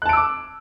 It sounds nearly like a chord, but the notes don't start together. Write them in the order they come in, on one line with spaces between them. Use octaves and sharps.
F#6 A5 D7 E6 D6